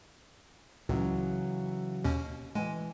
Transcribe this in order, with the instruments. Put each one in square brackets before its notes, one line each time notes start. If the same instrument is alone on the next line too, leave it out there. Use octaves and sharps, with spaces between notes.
[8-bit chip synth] C#2 [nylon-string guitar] C#3 E3 F#3
[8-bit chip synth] D#2 B2 C#4
[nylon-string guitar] E3 G#5 [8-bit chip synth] G#3